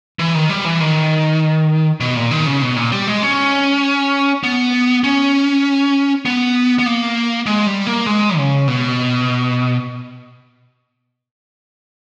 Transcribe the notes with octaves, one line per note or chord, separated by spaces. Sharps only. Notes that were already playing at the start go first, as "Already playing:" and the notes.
E3
D#3
G3
E3
D#3
B2
A#2
D#3
C#3
B2
A#2
G3
G#3
C#4
B3
C#4
B3
B3
A#3
G#3
G3
A#3
G#3
C#3
B2